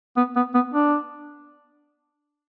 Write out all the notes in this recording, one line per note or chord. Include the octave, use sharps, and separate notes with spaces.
B3
B3
B3
D4